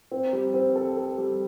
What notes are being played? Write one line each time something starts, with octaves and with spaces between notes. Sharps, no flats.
C4
G3
C4
A4
A4
G3